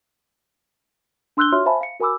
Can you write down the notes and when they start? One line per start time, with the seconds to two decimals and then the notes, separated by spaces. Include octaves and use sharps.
1.37 D4 C6 E6 F#6 G6 G7
1.52 F4 F#4 C#5 E5 C6 F6
1.66 C5 E5 F5 G#5 A5 B5
1.81 F5 C#7
2.00 F#4 A#4 G#5 B5 D6 E6